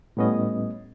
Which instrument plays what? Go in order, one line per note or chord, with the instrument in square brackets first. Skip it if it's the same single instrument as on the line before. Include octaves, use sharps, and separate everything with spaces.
[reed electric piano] A2 G3 B3 C#4 D#5